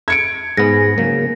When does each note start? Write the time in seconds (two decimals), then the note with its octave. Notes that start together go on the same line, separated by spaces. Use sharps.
0.08 G#6 C#7 D7
0.57 G#2 B3 G#4 A#6
0.98 C#3 F#3 A#3